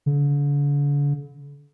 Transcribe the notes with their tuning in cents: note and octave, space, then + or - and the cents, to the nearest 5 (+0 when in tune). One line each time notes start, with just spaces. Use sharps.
D3 -40